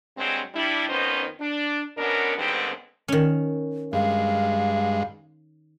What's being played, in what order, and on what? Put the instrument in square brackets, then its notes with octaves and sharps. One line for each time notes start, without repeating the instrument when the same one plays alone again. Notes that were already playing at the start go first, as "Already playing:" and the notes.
[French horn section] G2 F#3 G#3 C4
G3 D4 E4
F2 D#3 B3 C#4 D#4 C5
D4
B2 B3 C#4 D4 A#4
D#2 G#2 D3 G3 B3 C4
[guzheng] D#3 C#4
[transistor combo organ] G2 G#3 [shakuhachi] F5